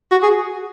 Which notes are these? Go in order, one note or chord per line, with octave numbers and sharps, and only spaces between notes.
F#4
G#4